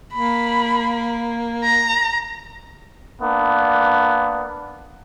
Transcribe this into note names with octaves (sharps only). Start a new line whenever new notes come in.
A#3 B5
A#5
A#3 B3 D4